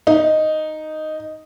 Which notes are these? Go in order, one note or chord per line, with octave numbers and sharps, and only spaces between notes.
D#4